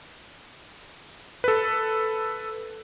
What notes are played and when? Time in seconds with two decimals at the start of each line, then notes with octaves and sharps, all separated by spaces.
1.44 A4 B4